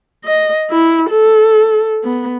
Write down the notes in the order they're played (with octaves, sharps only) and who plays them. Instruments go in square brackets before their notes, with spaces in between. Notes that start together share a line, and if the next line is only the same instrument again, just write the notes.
[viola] D#5
E4
A4
B3